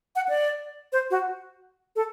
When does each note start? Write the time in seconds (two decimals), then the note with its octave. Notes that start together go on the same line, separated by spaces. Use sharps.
0.15 F#5
0.29 D5
0.92 C5
1.10 F#4
1.96 A4